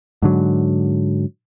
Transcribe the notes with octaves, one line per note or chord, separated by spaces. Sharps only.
G#2 D3 F#3